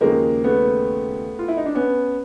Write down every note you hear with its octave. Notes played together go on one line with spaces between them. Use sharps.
D#2 C#3 F3 G#3 A#3
A3 B3
F4
E4
D#4
D4
B3 C#4